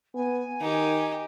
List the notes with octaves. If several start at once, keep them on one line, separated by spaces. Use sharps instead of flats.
B3 G#5
D#3 D#4 G4